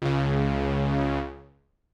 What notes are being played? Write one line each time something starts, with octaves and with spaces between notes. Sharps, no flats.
C#2 C#3